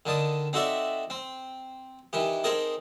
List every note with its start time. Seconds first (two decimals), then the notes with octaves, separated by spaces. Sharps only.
0.06 D3 D#3 A5 D#6
0.53 C4 D#4 F#4 A4 D5 E5
1.10 C4
2.13 D#3 E3 G4
2.44 C4 D#4 G#4 A#4 D#5 A5